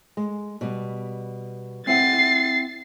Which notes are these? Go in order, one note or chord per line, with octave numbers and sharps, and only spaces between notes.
G#3
B2 G3
C4 E4 F#5 A6 C7